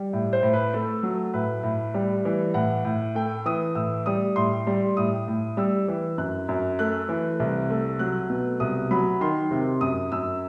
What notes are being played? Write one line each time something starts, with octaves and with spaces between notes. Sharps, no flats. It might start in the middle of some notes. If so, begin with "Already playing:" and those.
Already playing: G3
A2
C5
A2
B4
A3 A4
F#3
A2 B4
A2
G3
E3
A2 F#5
A2
A3 G5
E3 D#6
A2 E6
G3 D#6
A2 C6
G3
A2 D#6
A2
G3 E6
E3
F#2 F#6
F#2
A3 F#6
E3
C2
A3
F#3 F#6
B2
C2 D#6
F#3 B5
D#3 C6
C3
F#2 D#6
F#2 E6